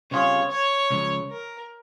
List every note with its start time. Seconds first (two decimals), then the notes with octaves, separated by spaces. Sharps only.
0.11 C#3 G3 C4 F4 G#4 C#5
0.51 C#5
0.91 C#2 C#3 F3
1.31 A#4